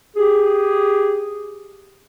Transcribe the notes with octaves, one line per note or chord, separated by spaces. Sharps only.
G4 G#4